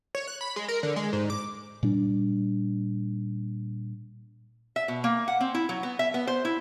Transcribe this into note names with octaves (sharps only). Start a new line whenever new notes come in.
C#5
F#6
B5
G#3
A#4
D3
G#3
G#2
D6
A#2 G3 D4
E5
B2
A#3
F#5
C4
E4
F#3
B3
E5
B3
C5
E4